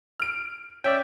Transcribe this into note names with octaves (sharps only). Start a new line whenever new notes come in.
F6 D7
C#4 D5 E5 G5